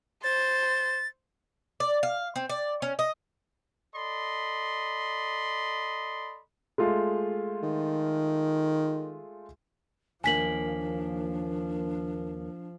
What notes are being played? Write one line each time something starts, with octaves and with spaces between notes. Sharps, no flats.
C5 A6
D5
F5
C4
D5
C#4
D#5
A4 D5 D#5 B5 C6
G#3 A3 F4
D#3
D#2 F3 A#3 D4 G#5 B6 F#7